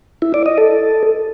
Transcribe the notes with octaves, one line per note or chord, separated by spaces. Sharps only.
E4
D5
D#5
A4